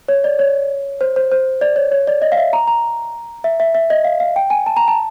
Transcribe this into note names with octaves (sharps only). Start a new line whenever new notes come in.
C#5
D5
C#5
C5
C5
C5
D5
C#5
C#5
D5
D#5
F5
E5
A#5
A#5
E5
E5
E5
D#5
F5
F5
G5
G#5
A5
A#5
A5